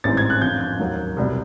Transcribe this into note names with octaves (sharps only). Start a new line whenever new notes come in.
A1 G#2 E3 G3 C4 A6
G#6
F#6
F2 D3 F3 G6
F#6
D#2 D#3 F#3 A#3
C2 B2 G3